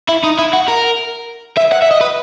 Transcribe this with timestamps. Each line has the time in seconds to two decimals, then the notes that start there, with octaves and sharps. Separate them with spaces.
0.09 E4
0.24 D#4
0.38 E4
0.53 F#4
0.68 A#4
1.57 E5
1.72 F#5
1.82 E5
1.91 D#5
2.01 B4